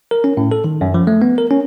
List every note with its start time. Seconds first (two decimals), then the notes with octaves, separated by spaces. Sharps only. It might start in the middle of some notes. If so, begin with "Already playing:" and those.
0.11 A#4
0.24 C#4
0.37 A2
0.52 A4
0.64 D#3
0.81 F#2
0.94 F3
1.07 A3
1.22 B3
1.38 A#4
1.51 C#4